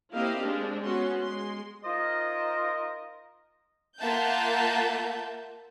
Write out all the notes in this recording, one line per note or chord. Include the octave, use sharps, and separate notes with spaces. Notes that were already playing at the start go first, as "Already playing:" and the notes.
A#3 C4 E4 G4 D#5 F5
G#3 C4 D4
B3 C#4 F#4 C6
G#3 C6
D#4 F4 A#4 C5 D#5
A#3 F4 E5 F#5 A5 G6